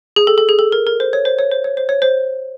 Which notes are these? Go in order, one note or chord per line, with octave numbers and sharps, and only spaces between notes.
G#4
A4
A4
G#4
A4
A#4
A#4
C5
C#5
C5
C#5
C5
C#5
C5
C#5
C5